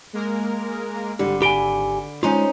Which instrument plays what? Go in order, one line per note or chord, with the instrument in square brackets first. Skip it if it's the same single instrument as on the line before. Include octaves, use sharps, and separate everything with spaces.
[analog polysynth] G#3 A#3 A#4
[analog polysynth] G#1 [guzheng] D3 [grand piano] G3
[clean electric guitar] G4 G#5 [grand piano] B5 D7 G7
[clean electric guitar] G#3 F4 [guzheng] C#4 D#4 C5